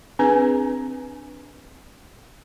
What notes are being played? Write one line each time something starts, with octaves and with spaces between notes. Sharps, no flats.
C4 D4 G#4 B4 G#5